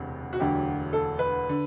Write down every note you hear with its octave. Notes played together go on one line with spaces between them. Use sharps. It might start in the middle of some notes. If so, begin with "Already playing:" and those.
Already playing: E1 D2 C3
F#4
E1 D2 D3 F#3 G4
A4
B4
D3